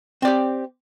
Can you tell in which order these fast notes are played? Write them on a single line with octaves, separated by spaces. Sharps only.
C4 D5 G4